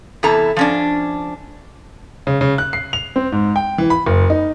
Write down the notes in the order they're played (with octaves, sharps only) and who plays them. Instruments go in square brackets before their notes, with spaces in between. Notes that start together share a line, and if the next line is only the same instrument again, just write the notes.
[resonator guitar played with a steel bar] E2 C3 E4 A4 A#5
F3 C#4 D4
[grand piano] C#3
C#3
F#6
C7
F7
C4
G#2
G5
E3
B5
F#1
D#4